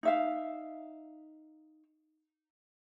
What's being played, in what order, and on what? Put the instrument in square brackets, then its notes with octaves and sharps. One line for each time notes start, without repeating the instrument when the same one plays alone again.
[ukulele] D#4 E5 F5